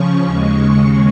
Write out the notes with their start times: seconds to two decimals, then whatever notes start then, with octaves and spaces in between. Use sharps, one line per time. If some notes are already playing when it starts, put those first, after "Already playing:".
Already playing: C#3 F3 C#4 C#6
0.25 D#2 C#3 G#3